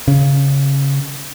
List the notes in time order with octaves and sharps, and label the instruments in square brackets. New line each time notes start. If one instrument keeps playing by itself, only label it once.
[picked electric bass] C#3